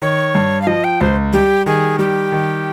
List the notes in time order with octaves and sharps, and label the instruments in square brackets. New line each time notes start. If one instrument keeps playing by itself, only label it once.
[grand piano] D#3 [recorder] C#5
[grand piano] G2
[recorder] F5
[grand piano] F3 [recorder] D#5
[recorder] G5
[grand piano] C#2 [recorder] C5
[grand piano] G3 [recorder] G4
[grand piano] D#3 [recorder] G#4
[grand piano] G3 [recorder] G4
[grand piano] D#3